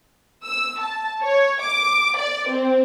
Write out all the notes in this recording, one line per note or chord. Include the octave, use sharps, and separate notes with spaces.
E6
A5
C#5
D6
D5
C4